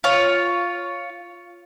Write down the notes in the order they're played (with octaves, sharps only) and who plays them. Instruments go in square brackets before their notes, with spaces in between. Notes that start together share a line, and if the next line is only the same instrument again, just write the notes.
[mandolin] F4 C#5